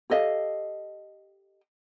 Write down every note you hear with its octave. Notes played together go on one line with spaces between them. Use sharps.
G4 A4 D#5 F5